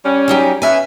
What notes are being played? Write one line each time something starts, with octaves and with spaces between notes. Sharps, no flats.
G3 C#4
F#3 D#4 G4
B2 C#4 E5 G#5